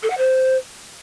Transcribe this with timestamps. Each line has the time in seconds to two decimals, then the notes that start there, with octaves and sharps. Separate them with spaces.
0.02 A4
0.10 F#5
0.17 C5